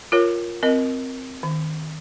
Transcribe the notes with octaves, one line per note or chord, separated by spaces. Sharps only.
F4 A#4 C#5
C4 A#4 D#5
D#3